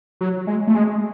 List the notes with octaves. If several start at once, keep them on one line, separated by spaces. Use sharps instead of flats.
F#3
G#3
A3
G#3